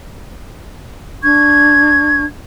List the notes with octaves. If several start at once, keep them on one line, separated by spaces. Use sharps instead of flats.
D4 C#6 G#6